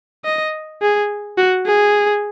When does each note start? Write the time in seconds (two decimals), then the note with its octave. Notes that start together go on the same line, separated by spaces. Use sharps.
0.25 D#5
0.82 G#4
1.37 F#4
1.66 G#4